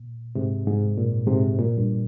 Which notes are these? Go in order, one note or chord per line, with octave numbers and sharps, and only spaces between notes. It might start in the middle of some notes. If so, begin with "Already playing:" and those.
Already playing: A#2
G#2 C3
G#2
A#2
G#2 C3
A#2
G2